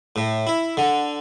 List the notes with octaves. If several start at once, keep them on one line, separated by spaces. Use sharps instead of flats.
A2
E4
D3